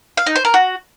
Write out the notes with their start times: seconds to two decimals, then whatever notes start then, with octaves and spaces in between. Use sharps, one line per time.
0.17 F5
0.26 D#4
0.36 C5
0.45 A#4
0.54 F#4